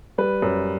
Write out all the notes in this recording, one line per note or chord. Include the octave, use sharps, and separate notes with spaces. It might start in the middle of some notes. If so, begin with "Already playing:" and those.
G3 B4
F#2